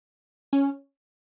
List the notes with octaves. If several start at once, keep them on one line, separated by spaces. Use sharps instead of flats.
C#4